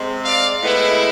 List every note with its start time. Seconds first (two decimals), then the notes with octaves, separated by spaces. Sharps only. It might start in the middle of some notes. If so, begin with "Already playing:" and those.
Already playing: C3 G#3 C4
0.24 D5 F5
0.62 A2 G#3 B3 E4